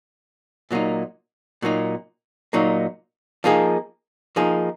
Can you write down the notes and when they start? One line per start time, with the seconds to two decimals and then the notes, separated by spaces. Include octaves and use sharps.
0.71 A#2 F#3 A#3 D#4
1.62 A#2 F#3 A#3 D#4
2.53 A#2 F#3 A#3 D#4
3.44 F3 A#3 D#4 G#4
4.36 F3 A#3 D#4 G#4